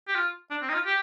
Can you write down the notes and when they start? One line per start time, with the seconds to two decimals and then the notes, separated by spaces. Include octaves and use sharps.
0.08 G4
0.15 F4
0.50 D4
0.62 C4
0.69 D#4
0.74 F4
0.86 G4